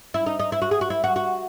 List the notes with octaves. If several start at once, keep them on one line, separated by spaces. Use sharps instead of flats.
E4
D#4
D#4
E4
F#4
G#4
F#4
E4
F#4
F#4